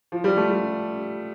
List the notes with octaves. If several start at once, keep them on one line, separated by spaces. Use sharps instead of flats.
F3
G3
A3
G3